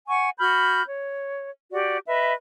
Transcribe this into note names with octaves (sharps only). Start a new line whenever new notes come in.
F#5 G#5 C#6
F#4 B5 F6 G6
C#5
F#4 G4 D5
B4 D#5 E5